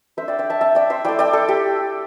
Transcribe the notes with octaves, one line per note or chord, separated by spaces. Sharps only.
A3 D4 C5 E5
D5 G5
D5 G5
E5 A5
E5 A5
D5 G5
C5 E5
A3 E4 D5 G5
D5 G5
A4
G4